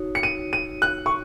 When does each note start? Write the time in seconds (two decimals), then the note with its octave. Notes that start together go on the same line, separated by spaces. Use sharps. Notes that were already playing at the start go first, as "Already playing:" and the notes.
Already playing: D#4 F#4 C#5
0.15 C#7
0.23 D#7
0.53 D#7
0.82 F#6
1.06 C#6